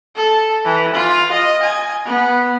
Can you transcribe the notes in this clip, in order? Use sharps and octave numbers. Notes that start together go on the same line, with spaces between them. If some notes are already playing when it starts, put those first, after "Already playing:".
A4
E3
F4
D#5
G#5
B3